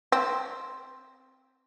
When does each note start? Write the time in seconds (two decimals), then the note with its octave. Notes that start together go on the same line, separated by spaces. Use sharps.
0.12 C4